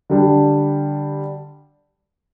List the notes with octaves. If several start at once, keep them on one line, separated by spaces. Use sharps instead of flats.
D3 G3 D4